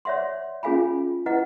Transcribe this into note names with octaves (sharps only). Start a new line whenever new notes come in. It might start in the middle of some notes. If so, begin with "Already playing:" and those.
C#5 D5 E5 F#5 C6
C#4 F4 G#4 F5 G#5 B5
E4 B4 D#5 F#5